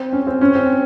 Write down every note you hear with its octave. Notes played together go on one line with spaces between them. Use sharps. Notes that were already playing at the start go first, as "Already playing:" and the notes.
Already playing: C4
C#4
C4
C#4
C4